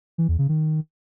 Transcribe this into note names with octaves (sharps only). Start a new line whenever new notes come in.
E3
E2
C#3
D#3